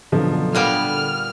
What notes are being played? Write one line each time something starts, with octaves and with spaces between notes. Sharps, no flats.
F#2 B2 D3 F3
A#2 G3 B3 F5 F6